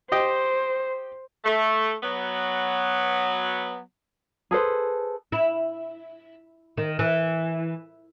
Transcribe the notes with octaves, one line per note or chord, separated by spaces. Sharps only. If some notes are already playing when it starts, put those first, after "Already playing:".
G4 C5 D#5 G5
A3
F#3 B3
G#4 A4 B4 C5
E4
D#3
E3